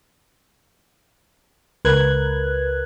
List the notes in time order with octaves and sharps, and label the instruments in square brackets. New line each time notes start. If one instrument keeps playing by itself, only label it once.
[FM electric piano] C#2 A#4 B4 F#6 G#6